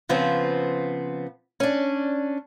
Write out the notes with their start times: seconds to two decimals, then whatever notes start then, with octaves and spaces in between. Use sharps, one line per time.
0.09 C#3 F3 B3 C4
1.60 C#4 D4